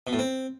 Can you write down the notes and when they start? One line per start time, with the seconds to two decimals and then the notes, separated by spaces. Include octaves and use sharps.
0.07 B2
0.13 A2
0.19 C4